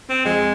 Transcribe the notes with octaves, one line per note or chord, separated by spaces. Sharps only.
C4
F2 G#3